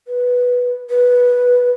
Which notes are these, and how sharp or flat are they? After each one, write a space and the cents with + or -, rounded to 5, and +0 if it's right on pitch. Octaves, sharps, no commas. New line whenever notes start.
B4 -5
B4 -10